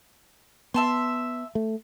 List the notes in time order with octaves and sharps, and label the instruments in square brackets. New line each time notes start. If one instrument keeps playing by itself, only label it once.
[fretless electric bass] B3 [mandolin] E5 A5 C6
[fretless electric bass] A3